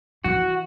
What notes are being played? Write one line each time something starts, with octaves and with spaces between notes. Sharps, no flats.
E3 F#4